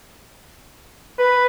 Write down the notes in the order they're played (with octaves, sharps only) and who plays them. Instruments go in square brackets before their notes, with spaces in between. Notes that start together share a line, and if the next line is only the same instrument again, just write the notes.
[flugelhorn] B4